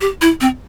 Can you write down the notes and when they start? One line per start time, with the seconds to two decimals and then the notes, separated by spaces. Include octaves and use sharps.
0.01 G4
0.21 E4
0.41 C4